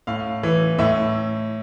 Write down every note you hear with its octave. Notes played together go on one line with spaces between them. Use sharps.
A2 F5
E3
A2 E5